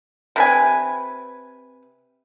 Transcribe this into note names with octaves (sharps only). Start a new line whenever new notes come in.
C3 B4 G#5